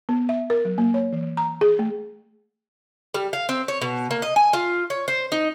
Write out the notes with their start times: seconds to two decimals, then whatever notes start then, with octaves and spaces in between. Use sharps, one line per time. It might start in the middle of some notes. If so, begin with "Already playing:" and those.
0.09 B3
0.29 E5
0.50 A#4
0.65 F#3
0.78 A#3
0.94 C#5
1.13 E3
1.37 A#5
1.61 G#4
1.79 A3
3.14 G3
3.33 F5
3.49 C4
3.68 C#5
3.81 B2
4.11 A#3
4.22 D#5
4.36 G#5
4.53 F4
4.90 C#5
5.08 C5
5.32 D#4